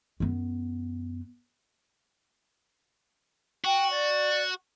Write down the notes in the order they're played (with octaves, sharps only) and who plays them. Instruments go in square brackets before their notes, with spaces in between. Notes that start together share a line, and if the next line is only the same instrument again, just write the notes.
[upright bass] F#2 B3
[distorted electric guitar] F#4 [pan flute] G5
[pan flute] D5